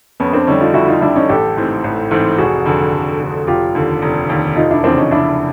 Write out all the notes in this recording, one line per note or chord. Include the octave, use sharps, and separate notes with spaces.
F2 B3 C#4
C4 D4
D3 G3 C#4 D#4
D#4 F4
F2 E4 F#4
D#4 F4
D3 G3 D4 E4
C#4 D#4
A1 G4 A4
G#2 E3 A3 C4
A1
G#2 E3 A3 C4
F1 F#4 G#4
F2 D3
F1
F2 D3
F1 F4 G4
D#2 D3
F1
D#2 D3
F1 D#4 F4
D4 E4
E2 C#3 F3 C4 D4
C#4 D#4
F1 D4 E4